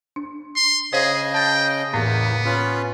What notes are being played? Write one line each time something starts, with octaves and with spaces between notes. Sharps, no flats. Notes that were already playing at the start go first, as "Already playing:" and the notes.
D4
C6
C#3 G#4 C5 C#5 D#5 F5
G5 A5 A6
E2 A2 C#3 A#3 B3
C#4 F4 B4